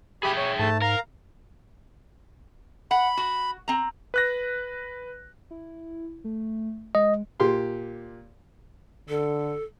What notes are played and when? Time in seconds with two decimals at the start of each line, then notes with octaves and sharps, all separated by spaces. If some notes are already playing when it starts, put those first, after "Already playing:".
0.23 G4 G#4 E5 G5 B5
0.37 C#5
0.59 G#2 A3 A5
0.82 A#4 F5 A#5
2.91 F#5 B5
3.17 F#4
3.68 C4 A#5
4.14 B4 F#6 A#6
5.51 E4
6.24 A3
6.95 G#3 D#5
7.40 A#2 G4 C6
9.09 D3 A4